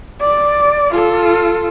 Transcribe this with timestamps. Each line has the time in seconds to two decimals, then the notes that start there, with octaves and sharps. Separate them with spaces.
0.22 D5
0.91 F4 A4